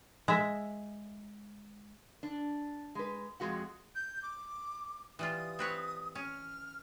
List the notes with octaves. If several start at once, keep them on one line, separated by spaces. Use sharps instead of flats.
G#3 E5
D4
G#3 B4
F2 D#3 G#3 F#4 F#5
G6
D6
E3 G3 F4 D#6
C4 B4 C#5
C#4 F6